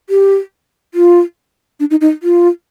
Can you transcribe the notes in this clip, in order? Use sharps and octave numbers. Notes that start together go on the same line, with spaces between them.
G4
F4
D4
D#4
D#4
F4